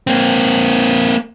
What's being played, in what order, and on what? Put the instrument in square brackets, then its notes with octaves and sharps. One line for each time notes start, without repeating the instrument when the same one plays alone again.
[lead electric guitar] A#3 C4